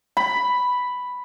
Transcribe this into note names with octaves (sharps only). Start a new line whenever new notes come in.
B5